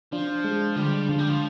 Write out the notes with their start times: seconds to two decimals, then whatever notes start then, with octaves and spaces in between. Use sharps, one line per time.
0.13 F3 D4
0.45 G#3
0.76 D3 G3
1.09 D3 F3
1.18 G3
1.29 F3